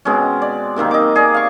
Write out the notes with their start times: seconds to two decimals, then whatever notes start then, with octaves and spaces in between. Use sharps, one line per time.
0.05 B2 G#3 C4 C#4
0.42 D5
0.76 C3 D#3 A#3 C4
0.91 D#5 D6
1.15 G#4 A#4 D5
1.34 F5 C#6